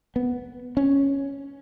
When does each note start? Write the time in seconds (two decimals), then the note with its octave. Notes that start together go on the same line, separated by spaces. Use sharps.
0.16 B3
0.77 C#4